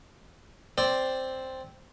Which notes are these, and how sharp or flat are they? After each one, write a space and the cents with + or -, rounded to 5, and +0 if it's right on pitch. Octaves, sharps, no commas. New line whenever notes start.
C4 +0 D5 +0